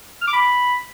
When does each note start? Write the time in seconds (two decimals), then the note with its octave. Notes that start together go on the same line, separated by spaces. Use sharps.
0.22 F6
0.27 D6
0.33 B5